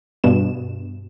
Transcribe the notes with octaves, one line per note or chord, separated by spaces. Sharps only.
G2 B2 E7